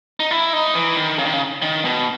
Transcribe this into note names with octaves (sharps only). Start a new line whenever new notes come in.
D#4
E4
D#4
E3
D#3
C#3
D#3
C#3
D#3
B2